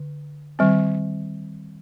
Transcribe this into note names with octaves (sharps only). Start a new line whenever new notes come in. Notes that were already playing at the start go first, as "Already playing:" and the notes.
Already playing: D3
D#3 G3 C4